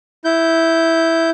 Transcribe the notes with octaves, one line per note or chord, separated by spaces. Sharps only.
E4 G6